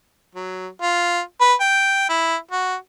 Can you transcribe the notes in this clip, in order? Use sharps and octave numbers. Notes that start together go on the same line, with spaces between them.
F#3
F4
B4
G5
E4
F#4